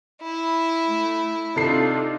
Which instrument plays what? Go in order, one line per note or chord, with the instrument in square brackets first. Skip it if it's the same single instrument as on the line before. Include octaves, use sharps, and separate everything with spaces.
[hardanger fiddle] E4
[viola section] A3
[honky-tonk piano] C3 A4 C7 [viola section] D4 D#4 F4